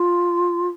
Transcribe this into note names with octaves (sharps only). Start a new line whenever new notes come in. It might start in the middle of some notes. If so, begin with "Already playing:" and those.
Already playing: F4